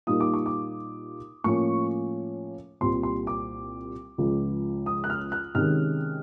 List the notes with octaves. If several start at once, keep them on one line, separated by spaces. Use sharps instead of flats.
A#2 G3 A#3 D#4 D#6
D6
C#6
D6
A2 F3 A#3 C#4 C#6
C2 A#2 G3 C4 C6
C6
D6
C#2 C#3 F3
D#6
F#6
F6
F#6
C3 D#3 G#3 C#4 F6